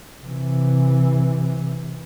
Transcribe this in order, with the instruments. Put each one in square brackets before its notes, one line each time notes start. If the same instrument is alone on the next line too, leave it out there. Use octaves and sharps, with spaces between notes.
[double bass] C3 E3